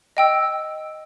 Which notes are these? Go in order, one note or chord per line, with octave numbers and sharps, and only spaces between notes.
D#5 G5 E6